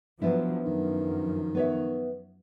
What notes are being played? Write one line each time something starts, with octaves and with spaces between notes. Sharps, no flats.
F3 F#3 B3 D4 E4
F#2 D#3 F3
B3 C#5 E5